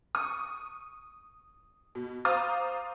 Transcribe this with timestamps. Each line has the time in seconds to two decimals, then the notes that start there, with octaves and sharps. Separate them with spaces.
0.15 C#6 D#6
1.95 B2
2.25 C5 F5 A#5 D6 D#6 A6